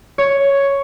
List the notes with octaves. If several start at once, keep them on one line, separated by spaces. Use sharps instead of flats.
C#5